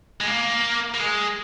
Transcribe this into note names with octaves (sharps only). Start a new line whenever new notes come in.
G#3
A#3
A#3
G#3